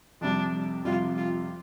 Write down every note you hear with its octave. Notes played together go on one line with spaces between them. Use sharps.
F2 C3 G3 D4
F2 C3 G3 F4
F4